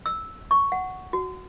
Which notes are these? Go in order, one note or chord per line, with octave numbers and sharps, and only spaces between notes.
E6
C#6
F#5
F#4